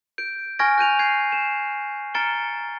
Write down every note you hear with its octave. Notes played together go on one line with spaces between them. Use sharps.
G6 D7
G#5 C#6 F6 G#6 A#6 D7
F#6 G6 D#7 F7
F#6 G#6 C7 D#7
E7
A#5 F6 A6 C#7 D7 G7